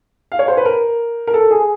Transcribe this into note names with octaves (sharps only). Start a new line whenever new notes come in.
F5
C#5
C5
B4
A#4
A#4
A4
G#4